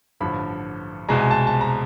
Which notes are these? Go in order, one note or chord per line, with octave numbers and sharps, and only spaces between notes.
A1 G2 D3 F3 B5
C2 B2 G#3 A#5
G#5
A5
A5
A#5